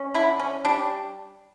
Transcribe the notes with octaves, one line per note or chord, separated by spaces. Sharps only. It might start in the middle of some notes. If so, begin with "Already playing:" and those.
Already playing: C#4
D3 E4
C#4
G3 D4